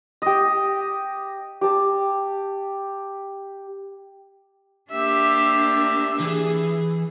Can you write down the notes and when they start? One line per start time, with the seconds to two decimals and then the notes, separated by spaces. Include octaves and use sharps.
0.22 G4 D#5
1.61 G4 A5
4.91 A#3 D4 G4 E5
5.70 E5
6.20 E3 G#4